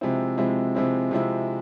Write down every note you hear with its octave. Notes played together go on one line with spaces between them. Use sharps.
C3 F3 G#3 C4 E4
C3 F3 G#3 C4 E4
C3 F3 G#3 C4 E4
C3 F3 G#3 C4 E4